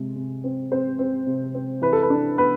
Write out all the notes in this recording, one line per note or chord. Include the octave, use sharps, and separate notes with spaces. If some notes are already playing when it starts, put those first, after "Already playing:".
Already playing: C3 G#3
C3
C4
C4 C5
C4
C3
C4
E3 B4
A4
B4
D4
B3 B4